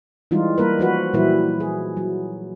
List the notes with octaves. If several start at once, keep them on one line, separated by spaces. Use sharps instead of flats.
E3 G3 G#3 D#4 F4
G3 A#3 A#4 B4
F3 F#4 B4
A#2 E3 F#3 G3 E4 B4
G#4
F#3